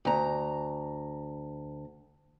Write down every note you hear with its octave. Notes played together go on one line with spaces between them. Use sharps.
D2 A#5